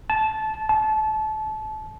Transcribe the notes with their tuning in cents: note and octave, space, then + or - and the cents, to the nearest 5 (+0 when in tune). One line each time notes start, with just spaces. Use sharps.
A5 -15
A5 -25